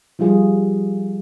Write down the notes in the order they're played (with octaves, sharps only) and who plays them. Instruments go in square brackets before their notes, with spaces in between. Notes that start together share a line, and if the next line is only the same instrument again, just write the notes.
[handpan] F3 G3 F4 G#4